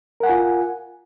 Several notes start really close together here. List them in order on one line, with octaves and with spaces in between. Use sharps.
A#4 F#5 G#5 F4